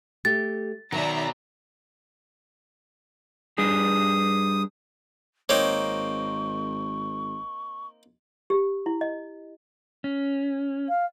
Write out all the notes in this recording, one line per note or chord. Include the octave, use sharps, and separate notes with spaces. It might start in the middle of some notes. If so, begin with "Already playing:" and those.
A3 G4 A6
B2 D#3 F#3 D5 E5 A#5
G3 D4 G#4 D#6
G#1 A#3 C4 D#4 C#5 C#6
G4
E4
D#5
C#4
F5